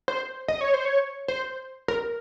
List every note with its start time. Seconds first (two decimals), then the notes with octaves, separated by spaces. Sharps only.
0.08 C5
0.48 D#5
0.61 C#5
0.74 C5
0.85 C#5
1.28 C5
1.88 A#4